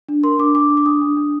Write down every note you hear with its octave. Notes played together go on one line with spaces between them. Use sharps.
D4
A#4 C6
D4 D6
D4 D6
D4
D6
D4 D#6
D4
D4